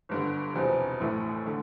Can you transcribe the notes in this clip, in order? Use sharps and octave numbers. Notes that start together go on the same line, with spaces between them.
G1 G2 D3
E1 E2 C3 F3
A1 A2 E3 A3 E4
D3 A3